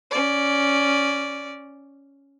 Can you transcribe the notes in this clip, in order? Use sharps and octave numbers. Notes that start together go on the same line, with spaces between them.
C#4 D5